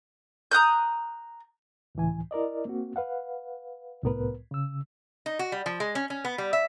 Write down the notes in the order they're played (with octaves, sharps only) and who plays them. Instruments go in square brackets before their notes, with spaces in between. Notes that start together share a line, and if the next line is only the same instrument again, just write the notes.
[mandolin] A#5 D#6 F#6 G6
[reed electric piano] C#2 A2 E3 G#5
E4 A#4 D5 D#5
A#3 C4 F#4
B4 F5 F#5
C2 A2 B3 A#4 B4
C#3 E6
[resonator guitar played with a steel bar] D#4
F#4
G3
F3
G#3
C#4
C#4
B3
G3
E5